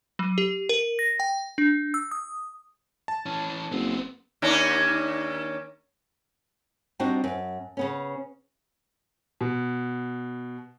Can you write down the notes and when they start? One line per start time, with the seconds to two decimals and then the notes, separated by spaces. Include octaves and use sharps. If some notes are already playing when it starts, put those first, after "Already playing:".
0.19 F#3
0.38 G4
0.69 A#4
0.99 A#6
1.20 G5
1.58 D4
1.94 E6
2.11 D#6
3.08 A5
3.26 E3 C#4
3.72 F#1 B3 C4
4.42 D#2 C#4 D4
7.00 G3 C4 D4 D#4 F#4 G4
7.24 F#2
7.77 C#3 B3 C#4
9.41 B2